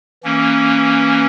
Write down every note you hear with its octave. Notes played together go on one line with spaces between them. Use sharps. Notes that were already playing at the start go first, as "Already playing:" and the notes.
E3 A#3 C#4